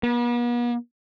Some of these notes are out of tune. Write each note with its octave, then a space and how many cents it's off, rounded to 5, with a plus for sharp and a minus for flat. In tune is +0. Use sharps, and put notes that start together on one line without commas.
B3 -45